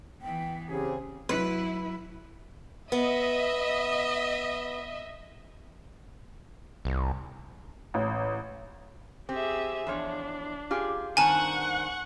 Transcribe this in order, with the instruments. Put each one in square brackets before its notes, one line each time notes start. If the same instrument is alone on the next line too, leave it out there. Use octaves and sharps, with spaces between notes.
[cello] E3 B3 [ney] G5
[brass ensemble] C#3 C4 G#4 [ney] G4
[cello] F#3 E4 [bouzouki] B4
[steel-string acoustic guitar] B3 [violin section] D#5 E5
[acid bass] C2
[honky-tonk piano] A1
[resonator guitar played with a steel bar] C4 [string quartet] G4 G#4 E5
[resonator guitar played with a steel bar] E2 F3 C#5 [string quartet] D4
[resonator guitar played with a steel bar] F4 G4 G#4
[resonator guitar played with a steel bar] G2 D#3 C4 [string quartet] F#5 C#6 F#6 [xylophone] G#5 A5